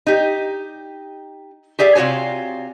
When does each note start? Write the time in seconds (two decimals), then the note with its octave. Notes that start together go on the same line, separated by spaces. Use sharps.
0.07 D#4 G4
1.79 G4 G#4 D5 E5
1.95 C3 F4 F#4 C#5 G#5